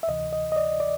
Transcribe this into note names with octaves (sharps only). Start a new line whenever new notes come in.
E5
D2 C3 E3 D#5
D#5
D#5
D5
D5